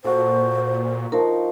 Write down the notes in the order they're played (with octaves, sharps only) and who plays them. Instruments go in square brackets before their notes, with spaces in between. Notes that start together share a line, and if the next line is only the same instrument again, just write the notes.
[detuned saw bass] A#2 [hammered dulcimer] F#4 A4 [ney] C5
[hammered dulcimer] F3 D#4 [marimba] A#4